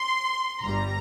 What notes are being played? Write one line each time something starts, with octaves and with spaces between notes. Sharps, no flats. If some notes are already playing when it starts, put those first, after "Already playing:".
Already playing: C6
G1 G2 G3 A#5